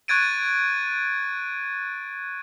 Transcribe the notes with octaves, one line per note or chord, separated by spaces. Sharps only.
C#6 F#6 G#6 A6 D7 D#7